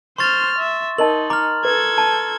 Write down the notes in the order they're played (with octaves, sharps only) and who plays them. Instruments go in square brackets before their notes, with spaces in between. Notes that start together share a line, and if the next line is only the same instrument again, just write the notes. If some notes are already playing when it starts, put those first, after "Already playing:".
[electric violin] C5 F6 [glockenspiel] C6 C#6 A6
[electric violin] E5
[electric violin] D#4 [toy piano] A#4 D#5 A5 [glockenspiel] F#7
[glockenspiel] A#5 F6 [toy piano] D6
[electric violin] A4 G#6 [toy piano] B4
[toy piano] A5